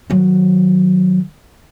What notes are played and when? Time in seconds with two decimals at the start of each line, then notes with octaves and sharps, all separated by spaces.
0.10 D#3 F#3